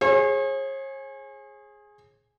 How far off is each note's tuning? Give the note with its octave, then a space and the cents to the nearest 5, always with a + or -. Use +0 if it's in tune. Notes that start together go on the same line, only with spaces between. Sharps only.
G#4 +0 C#5 -45